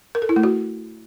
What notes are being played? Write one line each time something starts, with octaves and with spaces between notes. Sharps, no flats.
A#4
A4
E4
A3
F#4